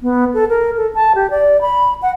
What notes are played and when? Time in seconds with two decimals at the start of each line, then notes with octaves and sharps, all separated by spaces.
0.01 B3
0.34 A4
0.49 A#4
0.77 A4
0.95 A5
1.15 G4
1.30 D5
1.61 B5
2.02 F#5